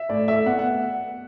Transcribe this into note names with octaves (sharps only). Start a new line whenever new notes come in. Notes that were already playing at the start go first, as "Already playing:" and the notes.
Already playing: E5
A2 D5
A3 E5
B3 F#5
F#5